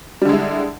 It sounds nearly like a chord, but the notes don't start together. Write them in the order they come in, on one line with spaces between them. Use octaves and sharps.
G3 D3 G#3 E4